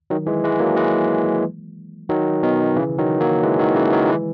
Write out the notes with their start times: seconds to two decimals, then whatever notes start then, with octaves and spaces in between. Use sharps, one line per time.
0.10 D#3 F#3
0.26 E3 G#3
0.44 E3 G#3
0.60 F#3 A#3
0.76 E3 G#3
2.09 D#3 F#3
2.43 B2 D#3
2.76 C#3 E3
2.98 D#3 F#3
3.20 F#3 A#3
3.43 E3 G#3
3.59 D#3 F#3
3.76 C#3 E3
3.92 D#3 F#3
4.08 E3 G#3